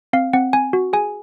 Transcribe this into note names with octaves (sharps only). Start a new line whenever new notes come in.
C4 F5
C4 F#5
C4 G#5
F#4
G#4 G#5